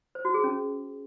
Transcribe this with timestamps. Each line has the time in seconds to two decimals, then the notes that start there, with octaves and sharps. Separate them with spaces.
0.15 C5
0.25 F#4
0.34 G#4
0.44 C#4